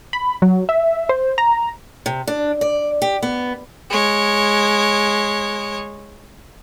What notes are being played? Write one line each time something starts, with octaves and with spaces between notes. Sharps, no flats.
B5
F#3
E5
C5
A#5
C3
D4
D5
G4
B3
G#3 C#5